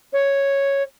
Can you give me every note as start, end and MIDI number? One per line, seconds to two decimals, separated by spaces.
0.12 0.82 73